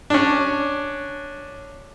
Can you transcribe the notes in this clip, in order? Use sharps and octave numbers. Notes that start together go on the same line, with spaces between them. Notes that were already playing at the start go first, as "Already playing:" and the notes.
C#4 D4